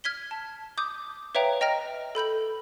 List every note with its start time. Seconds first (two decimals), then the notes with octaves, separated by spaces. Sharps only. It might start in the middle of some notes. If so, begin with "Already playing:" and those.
0.04 F6 G#6 B6 G7
0.31 A5
0.78 D6 D#6 G6
1.35 B4 C#5 E5 F5 G5 A#5
1.61 D#5 G5 A#5 F6 A#6
2.15 A4 B5 G6 F#7